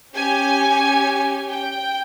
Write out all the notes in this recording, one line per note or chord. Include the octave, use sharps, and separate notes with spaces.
C#4 G4 G#5
G5